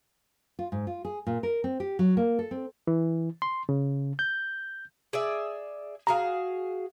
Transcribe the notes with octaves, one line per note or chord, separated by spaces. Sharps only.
F4
G#2
F4
G#4
A#2
A#4
C4
G4
F#3
A#3
A4
C4
E3
C6
C#3
G6
G#4 D5 E5
F#4 G#4 F5 A#5